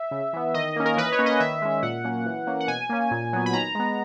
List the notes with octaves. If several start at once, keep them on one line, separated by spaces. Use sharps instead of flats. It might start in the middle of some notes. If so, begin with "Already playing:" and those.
Already playing: E5
C#3
E3 B3
D#3 D#5
A#3 C#4
A#4
E3 B4
C#5
A#3 C#4
D#5
D#3 E5
G#3 C#4
A#2 F#5
F#3 A#3 C#4
E3
A#3 C#4
F#5
B2 G#5
A#3 C#4
A#2
F#3 B3
B5
D#3 A#5
G#3 B3